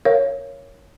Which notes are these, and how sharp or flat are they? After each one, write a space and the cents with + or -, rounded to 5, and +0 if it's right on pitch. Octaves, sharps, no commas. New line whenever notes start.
A#4 +0 C#5 +0 F5 -35